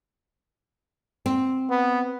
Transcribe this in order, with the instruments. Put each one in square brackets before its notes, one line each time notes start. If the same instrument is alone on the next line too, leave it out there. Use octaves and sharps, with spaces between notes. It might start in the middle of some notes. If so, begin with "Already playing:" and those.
[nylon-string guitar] C4
[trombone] B3